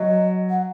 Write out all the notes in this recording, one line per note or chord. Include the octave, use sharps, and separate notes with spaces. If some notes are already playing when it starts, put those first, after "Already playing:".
Already playing: F#3 D#5
F#5